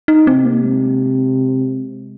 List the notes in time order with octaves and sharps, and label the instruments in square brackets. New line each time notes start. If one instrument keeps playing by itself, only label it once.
[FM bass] D#4
[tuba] C3 [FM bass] C4
[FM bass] A#3
G#3